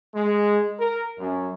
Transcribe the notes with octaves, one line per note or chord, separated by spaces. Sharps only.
G#3
A#4
F#2